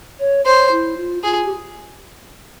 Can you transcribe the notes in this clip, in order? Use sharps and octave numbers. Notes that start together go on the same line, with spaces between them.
C#5
C5 C#5
E4
F4
F4 G#4
G4